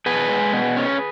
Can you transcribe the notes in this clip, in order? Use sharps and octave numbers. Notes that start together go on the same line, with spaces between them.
B2 G#4 B4
G#3
B2
C#4